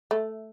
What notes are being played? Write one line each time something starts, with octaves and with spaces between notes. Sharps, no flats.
A3